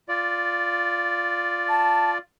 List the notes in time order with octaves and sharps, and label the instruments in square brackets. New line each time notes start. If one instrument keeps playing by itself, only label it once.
[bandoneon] F4 D5
[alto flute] A5